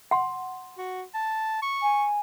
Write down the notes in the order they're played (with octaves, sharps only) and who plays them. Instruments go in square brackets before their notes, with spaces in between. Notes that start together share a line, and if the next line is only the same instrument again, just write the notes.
[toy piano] F#5 C6
[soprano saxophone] F#4
A5
C#6
[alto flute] G#5